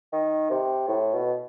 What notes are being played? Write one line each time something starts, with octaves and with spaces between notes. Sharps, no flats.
D#3
C3
A2
B2